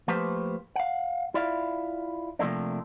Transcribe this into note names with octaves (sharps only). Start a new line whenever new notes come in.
F3 A3 A#3 G4 B4 C5
F5 F#5
E4 F4 D5 E5 F5
C3 F3 A3 A#3 D4